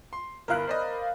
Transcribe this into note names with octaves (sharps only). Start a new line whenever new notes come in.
C6
G1 E4 A#4 F5 B5 F#6
C5 D5 D#5